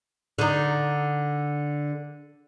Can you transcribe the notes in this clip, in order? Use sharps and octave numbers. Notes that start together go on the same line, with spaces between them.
D3 D#4